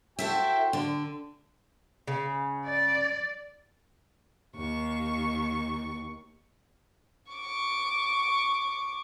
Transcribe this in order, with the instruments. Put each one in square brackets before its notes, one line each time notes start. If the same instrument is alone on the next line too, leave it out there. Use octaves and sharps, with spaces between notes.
[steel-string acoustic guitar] E4 A4 E5 [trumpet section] F#4 C5 G5
[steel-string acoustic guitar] D3
[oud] C#3
[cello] D5
[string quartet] D#2 C#6
[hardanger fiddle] C#6 D6